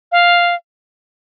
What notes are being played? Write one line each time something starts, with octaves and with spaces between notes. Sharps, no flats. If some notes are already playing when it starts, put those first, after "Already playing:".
F5